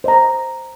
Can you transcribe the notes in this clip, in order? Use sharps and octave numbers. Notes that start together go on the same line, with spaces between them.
C5 D#5 A#5